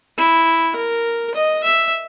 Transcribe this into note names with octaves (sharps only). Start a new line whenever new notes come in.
E4
A#4
D#5
E5